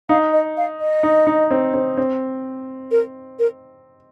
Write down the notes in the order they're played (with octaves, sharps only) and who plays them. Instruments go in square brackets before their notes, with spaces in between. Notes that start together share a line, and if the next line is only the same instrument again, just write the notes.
[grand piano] D#4 [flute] F5
[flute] D#5
F5
D#5
[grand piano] D#4
D#4
C4
C4
C4
[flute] A#4
A#4